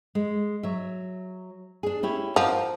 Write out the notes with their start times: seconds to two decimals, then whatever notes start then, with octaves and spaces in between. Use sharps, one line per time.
0.15 G#3
0.63 F#3 E5
1.83 D4 G#4
2.03 C#4 E4 G4
2.36 F3 A#4 F5 F#5